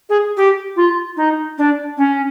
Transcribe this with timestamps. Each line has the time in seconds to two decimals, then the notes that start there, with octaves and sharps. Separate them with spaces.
0.10 G#4
0.37 G4
0.76 F4
1.17 D#4
1.58 D4
1.98 C#4